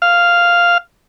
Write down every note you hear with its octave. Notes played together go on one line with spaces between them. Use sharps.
F5